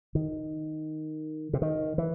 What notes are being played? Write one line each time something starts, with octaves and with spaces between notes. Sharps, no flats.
D#3
C3
D#3
E3